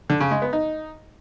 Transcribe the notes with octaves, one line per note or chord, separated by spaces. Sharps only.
D3
C#3
G#3
B3
D#4